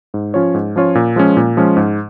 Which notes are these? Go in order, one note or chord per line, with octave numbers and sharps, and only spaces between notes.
G#2
F3 C#4 F4 C#5
G#2
F3 C#4 F4 C#5
A#2
F3 G#3 C#4
A#2
F3 G#3 C#4
G#2